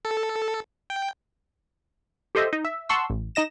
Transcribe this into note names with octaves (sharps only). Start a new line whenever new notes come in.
A4
G5
G4 A4 C5 D#5 E5
D#4
E5
F#5 A5 C6 C#6 E6
A1
D#4 D#5 A#6 E7